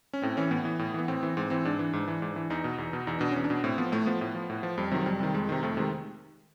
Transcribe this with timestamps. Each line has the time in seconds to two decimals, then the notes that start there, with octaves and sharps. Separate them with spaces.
0.13 C#4
0.22 A2 C4
0.37 E3 C#4
0.51 A2 B3
0.65 E3
0.79 A2
0.94 E3 B3
1.08 A2 C4
1.23 E3
1.37 G#2 C4
1.50 E3 C4
1.65 G#2 D4
1.79 E3
1.93 G#2
2.08 E3
2.22 G#2
2.36 E3
2.50 E2 D#4
2.64 B2
2.78 E2
2.93 B2
3.07 E2 D#4
3.19 B2 D4
3.31 E2 C#4
3.44 D4
3.50 B2
3.64 A2 C4
3.78 F3 B3
3.92 A2 A3
4.06 F3 B3
4.21 A2
4.35 F3
4.50 A2
4.63 F3
4.78 F2 G3
4.92 C3 D#3 F#3
5.06 F2 G3
5.20 C3 D#3
5.34 F2 G#3
5.49 C3 D#3
5.63 F2 A3
5.77 C3 D#3 G#3